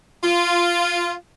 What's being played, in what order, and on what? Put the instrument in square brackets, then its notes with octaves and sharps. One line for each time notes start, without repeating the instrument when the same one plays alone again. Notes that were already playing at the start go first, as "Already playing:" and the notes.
[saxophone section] F4